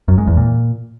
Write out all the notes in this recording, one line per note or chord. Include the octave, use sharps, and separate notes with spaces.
F#2
G#2
E2
A#2